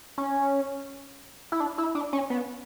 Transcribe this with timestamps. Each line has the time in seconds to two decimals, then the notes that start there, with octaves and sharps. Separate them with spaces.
0.18 C#4
1.52 E4
1.60 D4
1.78 E4
1.95 D4
2.13 C#4
2.30 B3